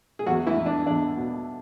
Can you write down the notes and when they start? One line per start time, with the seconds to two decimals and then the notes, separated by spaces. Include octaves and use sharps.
0.19 G#4
0.26 E2 F#3 F#4
0.46 E3 E4
0.57 E2
0.66 D4
0.86 E2 D4
1.17 B2